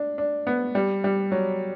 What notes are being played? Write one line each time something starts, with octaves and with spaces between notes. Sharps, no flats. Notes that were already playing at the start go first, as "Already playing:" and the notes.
Already playing: D4
D4
B3
G3
G3
F#3